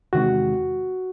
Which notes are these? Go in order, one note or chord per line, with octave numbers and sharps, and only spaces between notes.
E2 C3 D#3 G#3 F#4